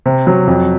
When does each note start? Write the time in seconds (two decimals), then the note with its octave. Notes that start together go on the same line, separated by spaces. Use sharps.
0.06 C3
0.27 F#3
0.47 F2